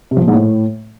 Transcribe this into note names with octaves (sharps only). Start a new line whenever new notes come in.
C3
F3
A#2
G#2
A2